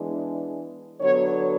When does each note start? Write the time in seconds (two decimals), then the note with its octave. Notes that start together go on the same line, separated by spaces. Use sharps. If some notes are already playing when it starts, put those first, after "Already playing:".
Already playing: E3 G#3 B3 D4
1.00 D3 F#3 B3 C#5